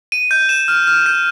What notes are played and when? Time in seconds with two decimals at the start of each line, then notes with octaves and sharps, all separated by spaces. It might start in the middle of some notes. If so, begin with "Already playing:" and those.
0.12 D#7
0.31 G6
0.49 E7
0.68 F6
0.87 F6
1.06 G6